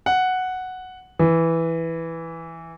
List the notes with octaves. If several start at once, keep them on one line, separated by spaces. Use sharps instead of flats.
F#5
E3